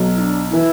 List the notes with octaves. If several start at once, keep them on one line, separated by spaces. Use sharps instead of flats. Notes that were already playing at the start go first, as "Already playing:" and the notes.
Already playing: B1 B2 F#3
E4
D4
E3 E4